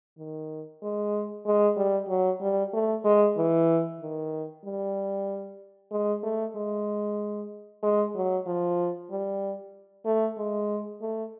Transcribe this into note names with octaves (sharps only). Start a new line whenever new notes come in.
D#3
G#3
G#3
G3
F#3
G3
A3
G#3
E3
D#3
G3
G#3
A3
G#3
G#3
F#3
F3
G3
A3
G#3
A3